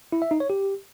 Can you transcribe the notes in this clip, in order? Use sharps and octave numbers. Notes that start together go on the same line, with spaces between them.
E4
E5
D#4
C#5
G4